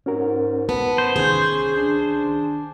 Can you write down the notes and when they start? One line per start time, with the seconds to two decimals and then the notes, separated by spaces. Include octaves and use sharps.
0.06 G#2 C#4 F#4 A#4
0.69 B3 A5
0.98 C5
1.16 C2 D#3 C#4 G#4 G6
1.76 D4